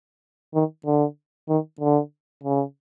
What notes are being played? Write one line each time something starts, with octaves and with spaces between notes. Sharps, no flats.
D#3
D3
D#3
D3
C#3